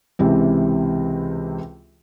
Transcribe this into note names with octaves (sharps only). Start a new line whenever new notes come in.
C#2 C3 E3 C4